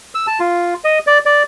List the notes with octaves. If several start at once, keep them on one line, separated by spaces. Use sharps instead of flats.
E6
A5
F4
D#5
D5
D5